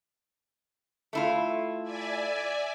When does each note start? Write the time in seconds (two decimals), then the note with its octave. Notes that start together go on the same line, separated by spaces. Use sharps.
1.13 A3 E4 F4
1.83 D5 E5 G#5